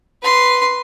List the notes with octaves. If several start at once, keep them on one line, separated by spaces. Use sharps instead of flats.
B4 C6